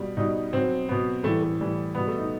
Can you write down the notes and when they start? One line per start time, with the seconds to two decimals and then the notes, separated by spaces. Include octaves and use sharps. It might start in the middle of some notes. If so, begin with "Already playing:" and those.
Already playing: B2 G3
0.17 B2 G3 D#4
0.53 B2 F#3 C4
0.88 B2 F#3 B3
1.24 A2 E3 G3 A3
1.42 A3
1.60 A2 E3 G3
1.95 B2 G3 B3
2.07 A3
2.18 D#4